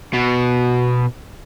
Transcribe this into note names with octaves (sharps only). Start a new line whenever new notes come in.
B2